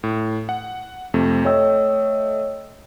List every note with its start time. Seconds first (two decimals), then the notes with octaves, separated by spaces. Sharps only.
0.03 A2
0.49 F#5
1.14 F2 C3 A3
1.45 A3 C#5 D#5 G5 E6